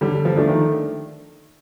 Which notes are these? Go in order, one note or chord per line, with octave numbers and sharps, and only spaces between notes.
D3 G3
F3
F3 A3 D4
D#3